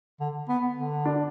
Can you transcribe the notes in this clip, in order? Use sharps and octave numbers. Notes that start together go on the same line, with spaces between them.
D3
B3
D3
D4